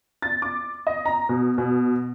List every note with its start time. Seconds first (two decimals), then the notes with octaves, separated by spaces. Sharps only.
0.22 A6
0.42 D6
0.87 D#5
1.05 A#5
1.29 B2
1.58 B2